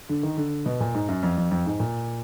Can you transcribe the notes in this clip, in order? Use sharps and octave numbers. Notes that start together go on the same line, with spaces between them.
D3
D#3
D3
B2
A#2
G#2
F#2
F2
F2
F2
G#2
A#2